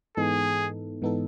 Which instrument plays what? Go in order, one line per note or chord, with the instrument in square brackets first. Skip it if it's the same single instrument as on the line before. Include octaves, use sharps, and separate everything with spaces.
[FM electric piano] G#2 E3 B3 D#4 A4 [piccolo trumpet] G#4
[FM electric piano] G#2 E3 B3 D#4 A4